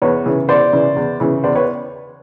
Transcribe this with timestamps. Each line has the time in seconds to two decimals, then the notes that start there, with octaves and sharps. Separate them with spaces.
0.02 E2 B4 C#5
0.25 C#3 E3
0.48 E2 C5 D5
0.72 C#3 E3
0.96 E2
1.20 C#3 E3
1.44 E2 C5 D5
1.55 B4 C#5